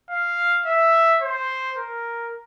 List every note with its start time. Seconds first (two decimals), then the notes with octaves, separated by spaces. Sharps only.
0.10 F5
0.66 E5
1.22 C5
1.77 A#4